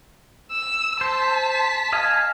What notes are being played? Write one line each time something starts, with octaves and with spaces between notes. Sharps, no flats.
E6
C5 A5 B6
D#5 F5 G#5